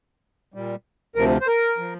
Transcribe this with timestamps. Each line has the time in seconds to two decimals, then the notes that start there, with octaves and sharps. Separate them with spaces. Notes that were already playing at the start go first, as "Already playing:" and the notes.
0.54 A#2 G3
1.15 D2 C3 F3 A#4
1.41 C5
1.47 A#4
1.78 F3